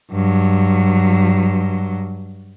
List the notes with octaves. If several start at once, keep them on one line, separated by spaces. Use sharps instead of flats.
G2 F#3